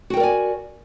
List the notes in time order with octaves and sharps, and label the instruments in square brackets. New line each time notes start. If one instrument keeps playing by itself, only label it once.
[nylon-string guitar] F#4
G5
A#4
D5
G#5